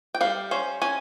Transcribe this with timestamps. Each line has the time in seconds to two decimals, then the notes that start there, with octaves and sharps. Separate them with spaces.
0.15 G5
0.21 G3 F5
0.51 C#4 C5
0.82 C#4 G#5